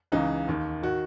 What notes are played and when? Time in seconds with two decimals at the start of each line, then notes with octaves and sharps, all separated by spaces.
0.12 C#2 C#3 E3 D#4
0.48 D#2 D#3
0.83 D#3 F#4